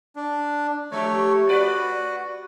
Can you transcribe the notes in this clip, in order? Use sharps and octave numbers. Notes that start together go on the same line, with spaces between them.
D4
F3 A3 G4 C#5
F#4 B4 D5